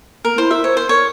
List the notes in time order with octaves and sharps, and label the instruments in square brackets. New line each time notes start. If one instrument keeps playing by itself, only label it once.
[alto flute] A#3 [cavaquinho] A#4
[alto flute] E4 [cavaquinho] C5
[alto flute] A#4 [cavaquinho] E5
[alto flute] C5 [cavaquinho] C#5
[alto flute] A#4 [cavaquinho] C5
[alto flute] A#4 [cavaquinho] C#5